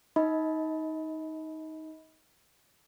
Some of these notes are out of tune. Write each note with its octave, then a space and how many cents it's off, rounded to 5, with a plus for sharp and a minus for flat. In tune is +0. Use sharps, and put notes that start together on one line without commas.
D#4 +15 D#5 +35 B5 +0